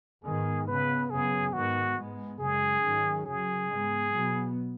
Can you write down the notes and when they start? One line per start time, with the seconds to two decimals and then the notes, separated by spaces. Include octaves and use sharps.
0.24 G#2 D#3 B3 G#4
0.67 C#3 B3 B4
1.10 F#2 C#3 F#3 B3 G#4
1.53 G#2 D#3 B3 F#4
1.96 G#2 G#3 B3
2.39 F#2 C#3 G#3 G#4
2.82 G#2 D#3 F#3 C#4
3.25 F#2 C#3 F#3 G#4
3.69 G#2 G#3 B3
4.12 B2 F#3 B3